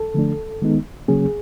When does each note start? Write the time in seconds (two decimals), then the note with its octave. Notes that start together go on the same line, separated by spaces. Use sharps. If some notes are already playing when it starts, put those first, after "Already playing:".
Already playing: A4
0.14 D3 F3 A3 D4
0.62 D#3 G#3 B3 D#4
1.08 C#3 F#3 A#3 C#4 G#4